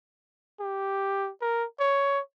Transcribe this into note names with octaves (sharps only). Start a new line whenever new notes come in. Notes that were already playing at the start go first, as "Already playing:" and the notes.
G4
A#4
C#5